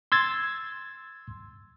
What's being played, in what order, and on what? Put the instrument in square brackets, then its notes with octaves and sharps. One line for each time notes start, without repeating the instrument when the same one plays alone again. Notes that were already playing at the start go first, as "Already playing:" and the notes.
[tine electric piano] C6 E6 G#6 A6